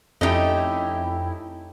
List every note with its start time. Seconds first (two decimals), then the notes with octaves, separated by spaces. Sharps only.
0.21 F2 A3 C#4 D#4 E4 G4 D#5